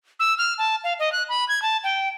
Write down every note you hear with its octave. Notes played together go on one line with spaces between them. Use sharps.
E6
F6
A5
F5
D#5
F#6
B5
G#6
A5
G5